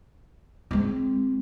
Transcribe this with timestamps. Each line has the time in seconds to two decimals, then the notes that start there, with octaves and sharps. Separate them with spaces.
0.71 G#3 C4